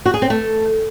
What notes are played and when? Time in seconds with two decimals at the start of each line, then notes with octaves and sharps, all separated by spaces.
0.06 F#4
0.14 G#4
0.22 C4
0.30 A3